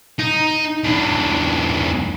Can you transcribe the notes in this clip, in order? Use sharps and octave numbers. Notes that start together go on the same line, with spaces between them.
D#4
E2 D3